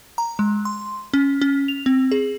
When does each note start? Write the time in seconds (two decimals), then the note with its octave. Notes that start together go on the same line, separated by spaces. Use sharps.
0.18 A#5
0.39 G#3
0.65 C6
1.14 C#4
1.42 C#4
1.68 F7
1.86 C4
2.12 G#4